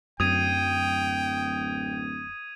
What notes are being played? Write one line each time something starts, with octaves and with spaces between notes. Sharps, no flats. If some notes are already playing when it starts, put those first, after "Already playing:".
D1 F#2 G5 D#6 G#6 D#7